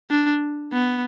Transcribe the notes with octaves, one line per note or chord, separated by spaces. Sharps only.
D4
B3